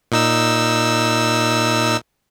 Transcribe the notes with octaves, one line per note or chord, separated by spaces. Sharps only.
A#2 D#4 E6